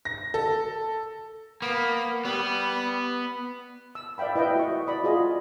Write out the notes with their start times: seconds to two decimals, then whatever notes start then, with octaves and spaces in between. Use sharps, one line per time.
0.05 A#6
0.34 A4
1.62 A#3 B3
2.25 G3 B3
3.95 E6
4.18 D5 E5 F5 G5 B5
4.35 E4 B4 D#5 E5 G5
4.56 F#4 D#5 C#6
4.87 D5 B5 D#6
5.04 F4 F#4 G#4 D5 D#5